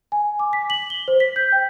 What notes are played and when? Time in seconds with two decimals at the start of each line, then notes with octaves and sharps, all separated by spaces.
0.12 G#5
0.39 D6
0.53 B6
0.70 F#7
0.90 G7
1.08 C5
1.20 B6
1.36 G6
1.52 G5